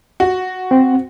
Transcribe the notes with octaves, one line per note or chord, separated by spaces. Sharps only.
F#4
C4